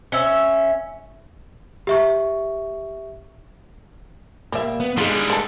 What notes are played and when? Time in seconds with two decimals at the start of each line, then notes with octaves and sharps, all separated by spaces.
0.12 C#4 E5
1.87 G4 E5 C#6
4.52 A#2 G3 A#3 D5 E5
4.80 B3
4.98 D3 G3 G#3 D#4 F4 G#4 G#5
5.30 D4 A4